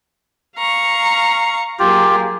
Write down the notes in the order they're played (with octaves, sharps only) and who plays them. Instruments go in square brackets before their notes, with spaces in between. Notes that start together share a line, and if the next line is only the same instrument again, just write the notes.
[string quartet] F5 A#5 C#6
[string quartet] F#3 A#3 G#4 [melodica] F4 G4